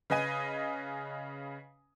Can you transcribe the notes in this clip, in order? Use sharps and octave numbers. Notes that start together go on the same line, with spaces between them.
C#3 B4 D#5 G#5 D#7